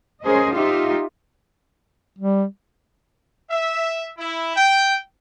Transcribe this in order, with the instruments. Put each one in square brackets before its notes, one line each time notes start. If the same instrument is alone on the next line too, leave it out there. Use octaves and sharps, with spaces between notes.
[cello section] C#4 G#4 A#4 C5 D#5
D#4 F4 G4 E5
[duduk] G3
[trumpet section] E5
E4
G5